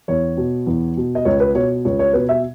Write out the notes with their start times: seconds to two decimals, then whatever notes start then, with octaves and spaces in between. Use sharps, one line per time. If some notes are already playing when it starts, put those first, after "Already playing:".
0.08 E2 C#5
0.37 B2
0.67 E2
0.97 B2
1.15 D#5
1.25 C#2 C#5
1.40 B4
1.55 B2 C#5
1.85 C#2 C#5
1.99 C#5
2.13 B2 B4
2.29 E5